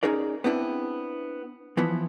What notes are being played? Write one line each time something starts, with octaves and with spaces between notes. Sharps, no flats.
C#4 D#4 G#4 A#4 D5
B3 C4 D4 E4
E3 F3 B3 E4